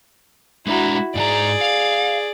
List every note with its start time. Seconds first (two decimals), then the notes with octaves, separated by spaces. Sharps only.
0.67 G#3 D4 E4 F#4 A#5
1.15 G#2 G#4 D5 G#5 A#5
1.61 F5